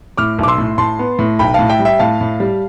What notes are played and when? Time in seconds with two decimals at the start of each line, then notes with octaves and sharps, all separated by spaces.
0.18 A2 D6 F6
0.39 B1 D6
0.48 C6 E6
0.58 A2
0.78 A2 A5 C6
0.99 B3
1.19 A2
1.39 B1 G5 B5
1.54 A2 F5 A5
1.69 E5 G5
1.79 G3
1.85 E5 G5
1.99 A2 F5 A5
2.21 A2
2.40 G3